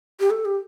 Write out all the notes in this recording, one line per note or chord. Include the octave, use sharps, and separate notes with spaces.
G4
A4
G4